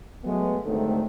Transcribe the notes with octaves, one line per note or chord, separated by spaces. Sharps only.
F#3 G#3 A3 B3
D2 G#2 C3 D#3 F#3 A3